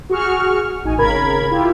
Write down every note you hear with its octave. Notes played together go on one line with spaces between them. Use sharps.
F#4 G#4 C#6 F6
A1 D#4 G#5
G#1 C#3 A#4 B5 G#6
E4 F4 G4